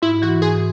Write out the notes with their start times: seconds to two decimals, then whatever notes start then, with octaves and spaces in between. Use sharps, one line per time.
0.02 G#2 E4
0.22 E3 F#4
0.42 G#2 G#4